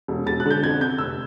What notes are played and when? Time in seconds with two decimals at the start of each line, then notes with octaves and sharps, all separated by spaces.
0.08 E1
0.26 E1 A6
0.40 F#6
0.46 D3 G6
0.62 F2 G#6
0.81 C3 G6
0.98 F1 E6